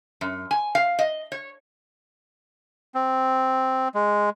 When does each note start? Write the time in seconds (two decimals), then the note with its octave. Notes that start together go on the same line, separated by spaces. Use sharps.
0.21 F#2
0.51 G#5
0.75 F5
0.99 D#5
1.32 C#5
2.95 C4
3.95 G#3